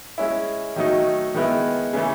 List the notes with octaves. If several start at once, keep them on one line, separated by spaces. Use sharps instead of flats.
G#3 C#4 E4
D#3 F#3 A3 D#4
D#3 G#3 B3 E4
C#3 E3 A3